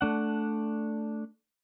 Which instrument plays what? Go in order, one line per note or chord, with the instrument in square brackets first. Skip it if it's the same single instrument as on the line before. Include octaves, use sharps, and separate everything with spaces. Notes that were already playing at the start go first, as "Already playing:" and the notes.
[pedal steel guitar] A3 D4 F#5